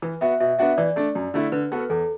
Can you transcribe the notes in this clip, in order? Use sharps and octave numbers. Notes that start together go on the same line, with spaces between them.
E3 B4
B3 F#4 E5
B2 E5
B3 D4 F#4 E5
E3 D5
A3 D4
F#2
D3 A3 E4
D3 B4
B3 F#4 A4
B4
E2 A4